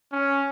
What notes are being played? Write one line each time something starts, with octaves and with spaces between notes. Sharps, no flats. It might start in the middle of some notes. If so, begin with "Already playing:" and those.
C#4